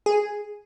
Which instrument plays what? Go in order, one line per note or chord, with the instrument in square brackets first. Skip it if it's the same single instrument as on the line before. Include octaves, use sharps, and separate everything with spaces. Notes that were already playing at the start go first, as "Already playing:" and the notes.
[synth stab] G#4